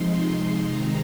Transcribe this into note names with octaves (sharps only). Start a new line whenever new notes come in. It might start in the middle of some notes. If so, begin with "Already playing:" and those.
Already playing: C3 F3 G#3 D#4 C6
C3 D#3 G#3 C4 D#4 A#5